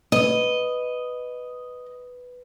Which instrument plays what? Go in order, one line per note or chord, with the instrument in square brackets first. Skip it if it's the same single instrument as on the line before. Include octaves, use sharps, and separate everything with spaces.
[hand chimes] B4 [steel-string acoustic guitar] D#5